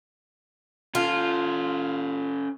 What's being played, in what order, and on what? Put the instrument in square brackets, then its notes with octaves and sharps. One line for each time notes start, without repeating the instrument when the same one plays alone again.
[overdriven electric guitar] C#4 A4 [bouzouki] F4